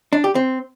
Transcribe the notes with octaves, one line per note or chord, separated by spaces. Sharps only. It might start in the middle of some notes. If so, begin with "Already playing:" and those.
D4
G4
C4